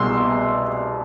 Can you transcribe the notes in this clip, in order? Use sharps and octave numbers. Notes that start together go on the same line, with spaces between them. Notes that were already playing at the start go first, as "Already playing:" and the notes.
Already playing: C2 B2 C6 E6